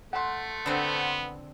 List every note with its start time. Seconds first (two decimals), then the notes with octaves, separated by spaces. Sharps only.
0.13 A3 F#5 C6
0.66 D3 B3 C4